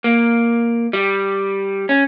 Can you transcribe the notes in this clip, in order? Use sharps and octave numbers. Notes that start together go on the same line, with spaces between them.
A#3
G3
C#4